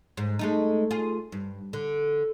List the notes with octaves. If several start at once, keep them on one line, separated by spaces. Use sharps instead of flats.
G#2
G#3 A3 D#4
F4 G#4
G2
D3